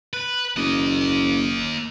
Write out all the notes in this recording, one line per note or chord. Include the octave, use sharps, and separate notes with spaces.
B4
F#1 A#3 D#5